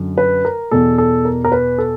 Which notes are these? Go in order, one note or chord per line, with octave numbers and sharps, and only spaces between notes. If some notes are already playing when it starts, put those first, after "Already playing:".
Already playing: F#2 D3
B4
A#4
E2 B2 A4
A4
A#4
A#4
B4
A4